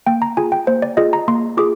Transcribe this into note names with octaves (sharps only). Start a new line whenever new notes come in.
A#3 G5
A#5
F4 G#4 G#5
G5
A#3 C5
D5
F4 G#4 D#5
A#5
A#3 C6
F4 G#4 D6